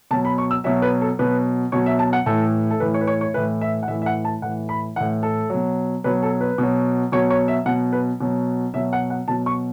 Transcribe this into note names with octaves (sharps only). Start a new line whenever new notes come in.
B2 F#3 A5
B5
C#6
E6
B2 F#3 E5
B4
A4
B2 F#3 B4
B2 F#3 C#5
E5
A5
F#5
A2 E3 A4
A4
A2 E3 B4
C#5
B4
C#5
C#5
A2 E3 B4
E5
F#5
A2 E3 E5
E5
F#5
A5
A2 E3 F#5
B5
A2 E3 F#5
A4
B2 F#3
B2 F#3 B4
A4
B4
B2 F#3
B2 F#3 C#5
C#5
E5
B2 F#3 F#5
B4
B2 F#3
B2 F#3 E5
F#5
F#5
B2 F#3 A5
C#6